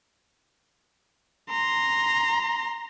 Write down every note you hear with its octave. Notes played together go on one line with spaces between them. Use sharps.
A#5 C6